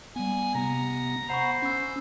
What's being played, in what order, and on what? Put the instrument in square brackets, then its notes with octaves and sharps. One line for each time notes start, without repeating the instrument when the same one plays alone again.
[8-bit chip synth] G3 B3 [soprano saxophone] G#5
[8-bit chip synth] C3 B3 [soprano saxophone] A#5
[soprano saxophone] C5 [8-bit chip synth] F#5 B5 C#6
[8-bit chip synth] C#4 E6